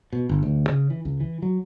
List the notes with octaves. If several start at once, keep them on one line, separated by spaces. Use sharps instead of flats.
B2
G1
D2
C#3
E3
C#2
E3
F#3